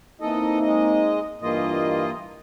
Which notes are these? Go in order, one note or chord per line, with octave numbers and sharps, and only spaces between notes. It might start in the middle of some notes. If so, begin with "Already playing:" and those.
E3 A#3 C4 D#4 A4 D#5
G#3 D#5
G2 E3 A#3 F4 D#5